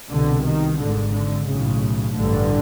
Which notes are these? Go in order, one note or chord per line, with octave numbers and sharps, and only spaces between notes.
C2 B2 D3
D#3
G#1 G#2 D3
D3
B1 A2 C#3
A1 G2 D3